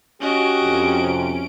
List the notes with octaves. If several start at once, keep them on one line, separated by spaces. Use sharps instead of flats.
C#4 F#4 G4 D#5 D7
F2
C3